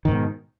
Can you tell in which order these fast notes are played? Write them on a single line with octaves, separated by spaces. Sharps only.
D#3 G#2 B2